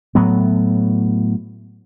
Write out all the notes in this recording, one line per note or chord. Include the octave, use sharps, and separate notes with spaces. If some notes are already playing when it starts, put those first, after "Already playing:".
A2 F#3 B3